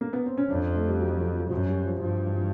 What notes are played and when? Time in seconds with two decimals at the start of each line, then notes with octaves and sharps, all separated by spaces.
0.01 A#3
0.13 B3
0.26 C4
0.38 C#4
0.49 F2 D4
0.75 A3
0.87 G3
1.00 F#3
1.17 F3
1.34 F3
1.46 F3
1.50 F#2 F#3
1.67 G3
1.85 F3
2.01 G2 F3
2.27 E3
2.35 F3